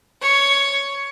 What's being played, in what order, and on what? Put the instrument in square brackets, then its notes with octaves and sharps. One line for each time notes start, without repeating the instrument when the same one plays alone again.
[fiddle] C#5